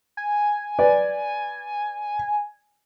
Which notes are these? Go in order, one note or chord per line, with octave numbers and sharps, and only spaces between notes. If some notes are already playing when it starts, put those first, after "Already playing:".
G#5
B4 D5